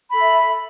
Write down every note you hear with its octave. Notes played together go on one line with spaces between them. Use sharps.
A4 E5 B5